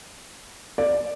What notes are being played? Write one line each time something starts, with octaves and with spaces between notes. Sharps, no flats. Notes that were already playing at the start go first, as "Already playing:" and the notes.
D5